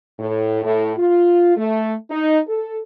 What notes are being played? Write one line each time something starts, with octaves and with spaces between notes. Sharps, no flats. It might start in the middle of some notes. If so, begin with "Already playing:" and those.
A2
A2
F4
A3
D#4
A4